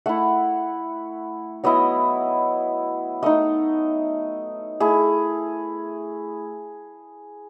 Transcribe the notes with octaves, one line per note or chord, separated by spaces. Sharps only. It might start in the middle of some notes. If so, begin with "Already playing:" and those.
A3 E4 F#5
F#3 B3 E4 D#5
A3 D#4 D#5
A3 E4 G#4